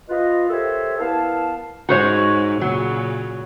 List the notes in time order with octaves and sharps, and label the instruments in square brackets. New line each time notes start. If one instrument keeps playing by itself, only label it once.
[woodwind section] F4 B4 D#5
G4 A4 A#4 C5 C#5 E5
B3 E4 A#4 F5 A5
[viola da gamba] G#2 D#4 [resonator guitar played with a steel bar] F#4 C5 C#5
[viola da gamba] A#2 C#3 [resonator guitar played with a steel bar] F#3